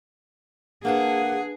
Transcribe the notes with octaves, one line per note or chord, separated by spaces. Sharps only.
A#3 D4 G#4 B4 F#5 A5